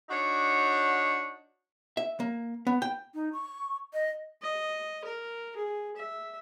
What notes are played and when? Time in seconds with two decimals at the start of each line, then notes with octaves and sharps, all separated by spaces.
0.09 D4 D#4 F#4 C#5
1.97 E5
2.20 A#3
2.67 B3
2.82 G5
3.15 D#4
3.33 C#6
3.93 D#5
4.42 D#5
5.04 A#4
5.56 G#4
5.96 E5